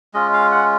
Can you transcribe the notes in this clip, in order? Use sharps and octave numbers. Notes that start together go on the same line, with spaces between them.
G#3 C#4 F4 D#5
F5
F#5